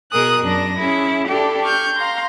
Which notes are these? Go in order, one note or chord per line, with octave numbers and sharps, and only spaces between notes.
B2 G#4 A#4 D#6 F#6
F#2 D4 A#6
C#4 E4 G#4
D4 G4 A4
C#6 F6 G6
F5 A#5 C6